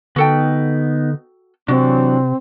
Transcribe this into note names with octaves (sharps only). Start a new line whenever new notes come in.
D3 B3 D#4 F#4 A4 G5
C3 E3 F#3 C4 D4 F#4